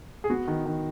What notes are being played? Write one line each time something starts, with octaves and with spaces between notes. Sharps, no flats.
G#4
B3 F#4
D#3
D#3